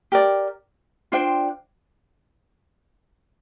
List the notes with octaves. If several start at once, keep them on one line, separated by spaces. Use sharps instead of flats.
G4 A#4 D5
D4 F4 C5 G5